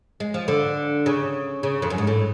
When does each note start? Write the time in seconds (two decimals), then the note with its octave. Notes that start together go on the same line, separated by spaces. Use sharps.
0.20 G#3
0.34 F3
0.48 D3
1.06 C#3
1.63 C#3
1.82 F2
1.90 F#2
1.98 G#2
2.07 A2